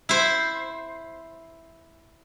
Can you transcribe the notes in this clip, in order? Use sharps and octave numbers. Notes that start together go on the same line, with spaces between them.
E4 C5